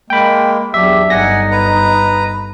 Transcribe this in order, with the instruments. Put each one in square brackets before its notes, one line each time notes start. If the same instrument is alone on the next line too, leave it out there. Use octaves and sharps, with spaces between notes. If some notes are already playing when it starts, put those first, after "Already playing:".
[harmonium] G#3 A#3 [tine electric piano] G5 B5
[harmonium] E2 G4 [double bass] F#3 D4 [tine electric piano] E5
[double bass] G1 D#4 [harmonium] F#5 G#5 [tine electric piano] A#6
[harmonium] B4 A#5